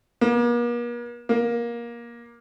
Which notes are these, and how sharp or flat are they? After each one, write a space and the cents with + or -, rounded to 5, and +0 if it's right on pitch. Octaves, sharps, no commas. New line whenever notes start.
A#3 +45
A#3 +20